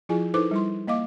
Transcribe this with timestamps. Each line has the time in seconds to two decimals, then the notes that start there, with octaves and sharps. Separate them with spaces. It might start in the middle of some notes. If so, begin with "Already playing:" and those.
0.09 F3 E4 F4 G#4 G#5
0.34 D#4 E4 A4 B4 C5 D6
0.51 G3 E4 C6
0.87 A#3 D#5 F5 D6